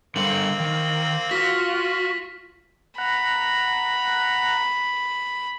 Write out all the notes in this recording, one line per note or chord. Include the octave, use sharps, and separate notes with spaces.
D3 G3 A#3 C4 A4 F#7
D#3
F4 F#4 B6
F#5 A#5 B5